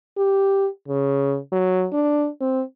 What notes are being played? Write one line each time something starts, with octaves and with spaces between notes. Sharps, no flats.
G4
C#3
F#3
D4
C4